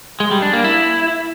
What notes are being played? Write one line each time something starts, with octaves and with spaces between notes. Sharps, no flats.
G#3
G3
D4
A#3
E4